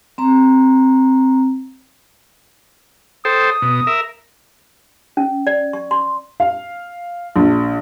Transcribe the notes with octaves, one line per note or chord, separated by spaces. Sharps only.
C4 A#5
A4 C5 G5 D#6
B2
A#4 E5
C#4
D5
C#6
C6
F5
A#1